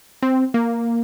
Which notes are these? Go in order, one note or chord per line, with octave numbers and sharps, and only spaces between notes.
C4
A#3